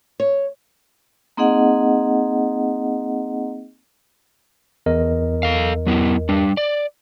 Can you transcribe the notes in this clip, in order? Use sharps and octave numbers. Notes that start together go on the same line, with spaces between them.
C#5
A#3 C4 D#4 G#4 D#5 F#5
E2 A#4 D#5
A4 F5
F#3 B3 E4
G3 D4
D5